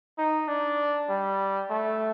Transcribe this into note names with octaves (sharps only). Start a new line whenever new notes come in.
D#4
D4
G3
A3